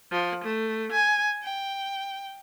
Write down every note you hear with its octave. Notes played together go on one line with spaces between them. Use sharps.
F3
A3
G#5
G5